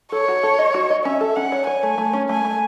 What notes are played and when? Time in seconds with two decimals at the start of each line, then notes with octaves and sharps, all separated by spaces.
0.12 A4 C#5
0.28 F#4
0.43 A4
0.59 D#5
0.74 F#4
0.90 D#5
1.05 C#4 E5
1.21 A4
1.36 C#4 F#5
1.52 C#5
1.67 C#5 G#5
1.83 A3
1.98 A3
2.13 C#4
2.29 A3 G#5
2.45 A3